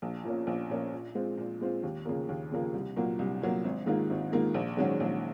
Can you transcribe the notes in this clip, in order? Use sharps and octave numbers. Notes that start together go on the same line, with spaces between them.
A#1
A#2 F3 A#3 C#4
A#1
A#2 F3 A#3 C#4
A#2
G#3 C4 F4
A#2
G#3 C4 F4
D#2
C#3 F3 A#3
D#2
C#3 F3 A#3
C2
A#2 F#3 A#3
C2
A#2 F#3 A#3
G#1
G#2 D#3 A#3 F4
G#1
G#2 D#3 A#3 F4
A#1
G#2 D#3 F#3 C#4
A#1